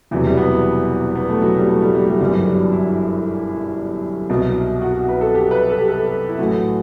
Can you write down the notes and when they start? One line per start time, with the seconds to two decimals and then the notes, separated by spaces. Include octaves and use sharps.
0.11 E1 E2 C3 E3 F#3
0.25 G3
0.37 B3
1.15 B3
1.29 A3
1.42 F#3
1.56 G3
1.69 A3
1.82 G3
1.95 G3
2.08 G3
2.20 G1 F#2 E3 G3
2.34 F#3
2.47 G3
2.60 D4
2.72 E4
4.30 C2 B2 F#3
4.82 F#4
5.08 B4
5.21 A4
5.35 G4
5.51 B4
5.70 A4
5.78 G4
5.88 A4
6.29 E4
6.38 A1 A2 F#3 F#4